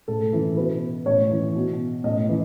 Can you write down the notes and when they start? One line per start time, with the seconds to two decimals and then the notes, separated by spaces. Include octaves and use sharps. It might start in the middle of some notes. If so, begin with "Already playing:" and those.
0.08 A2 A4
0.33 E3
0.57 B2 B4
1.06 A2 C#5
1.31 E3
1.55 B2
2.04 A2 D#5
2.29 E3